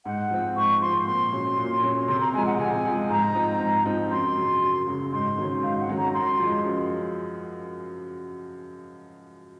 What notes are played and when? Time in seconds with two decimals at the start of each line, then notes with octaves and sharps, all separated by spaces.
0.05 G#2 F#5
0.31 F3 C4
0.56 G#2 C#6
0.81 F3 C4 C6
1.07 A#2 C6
1.32 F#3 C#4
1.58 A#2
1.83 F#3 C#4
2.08 C3 C6
2.21 A#5
2.34 G#3 G#5
2.38 F3
2.46 F#5
2.59 C3 G#5
2.84 F3 G#3
3.10 G#2 A#5
3.35 F3 C4 D#4
3.60 G#2
3.85 F3 C4 D#4
4.11 F#2 C6
4.37 C#3 F#3
4.62 F#2
4.87 C#3 F#3
5.12 G#2 C6
5.38 D#3 F#3 C#4
5.63 G#2 F5
5.80 F#5
5.89 D#3 F#3 C#4
5.97 A#5
6.14 F#2 C6
6.40 F3 G#3
6.65 F#2